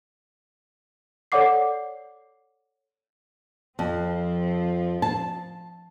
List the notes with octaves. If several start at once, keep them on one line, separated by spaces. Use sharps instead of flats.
A4 C#5 D5 F#5 D6 C7
F2 F3 C4
A5